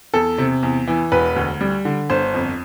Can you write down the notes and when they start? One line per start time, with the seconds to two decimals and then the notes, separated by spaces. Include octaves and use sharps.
0.14 E2 A4
0.38 C3
0.63 E2
0.88 E3
1.12 E1 B4
1.36 D2
1.61 G3
1.85 D3
2.10 G1 C5
2.34 F2